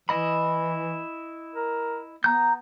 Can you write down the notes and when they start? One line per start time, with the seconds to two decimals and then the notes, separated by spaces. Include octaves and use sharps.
0.09 E3 E4 D#5 B5
1.55 A#4
2.24 B3 A#5 G6